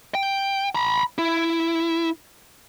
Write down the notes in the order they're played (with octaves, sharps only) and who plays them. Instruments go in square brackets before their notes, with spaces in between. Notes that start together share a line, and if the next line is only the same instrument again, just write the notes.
[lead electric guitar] G5
A#5 B5
E4